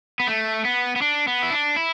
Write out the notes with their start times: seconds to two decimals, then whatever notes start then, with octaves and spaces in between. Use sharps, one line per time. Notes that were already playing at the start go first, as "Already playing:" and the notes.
0.20 B3
0.28 A3
0.65 B3
0.96 B3
1.02 D4
1.27 B3
1.43 E4
1.52 D4
1.76 E4